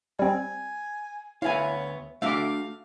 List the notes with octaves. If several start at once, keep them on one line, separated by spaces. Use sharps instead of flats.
G3 C4 G#5
D2 B3 E4 C#5 F5 G#5
A3 D4 F#4 E5 F5 D6